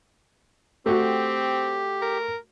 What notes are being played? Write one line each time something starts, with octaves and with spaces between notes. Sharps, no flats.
A3 C4 F#4 G4
A#4